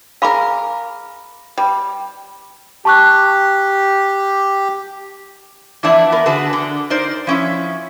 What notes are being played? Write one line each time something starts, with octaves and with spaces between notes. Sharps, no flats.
G#4 A#4 F5 B5 D6
G3
G4 A5 C#6 F#6
E3 F3 A3 B3 D4 E4
B3 A#4
D3 F#4 G#4 B4 A5
D3
D#4 A#4 C5 D5
F3 C#4 E4